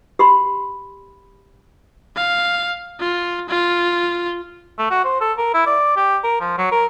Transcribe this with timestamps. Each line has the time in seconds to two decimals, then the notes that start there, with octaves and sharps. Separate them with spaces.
0.19 G4 B5 C6
2.17 F5
3.00 F4
3.49 F4
4.79 A3
4.91 F#4
5.04 C5
5.21 A4
5.37 A#4
5.54 E4
5.66 D5
5.97 G4
6.24 A#4
6.40 F3
6.58 F#3
6.72 A#4